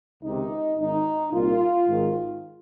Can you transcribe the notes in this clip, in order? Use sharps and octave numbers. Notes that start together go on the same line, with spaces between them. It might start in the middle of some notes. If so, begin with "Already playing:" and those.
C#2 C3 D#3 D#4
G#1 G#2 D#3 D#4
C2 A#2 F4
G#1 G#2 D#3